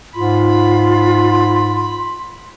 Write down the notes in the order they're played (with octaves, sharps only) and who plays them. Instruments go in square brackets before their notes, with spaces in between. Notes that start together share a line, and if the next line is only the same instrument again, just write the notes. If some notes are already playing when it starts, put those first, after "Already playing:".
[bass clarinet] G#2 [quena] F4 [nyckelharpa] B5 [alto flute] C6